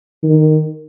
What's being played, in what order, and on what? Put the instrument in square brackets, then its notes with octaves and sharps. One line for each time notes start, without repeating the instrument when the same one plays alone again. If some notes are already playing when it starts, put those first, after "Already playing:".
[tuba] D#3